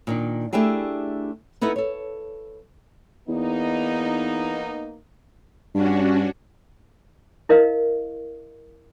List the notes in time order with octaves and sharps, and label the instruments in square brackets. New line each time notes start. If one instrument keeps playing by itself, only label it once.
[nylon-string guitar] A#2 D#3 D4
A3 D4 E4 G4 G#4
B3 D#4 E4 A4 B4
A4 C#5
[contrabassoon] E2 [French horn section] A#3 B3 D#4
[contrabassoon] G2 [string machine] C#4 D4 F#4
[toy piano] E4 A#4 D#5 F5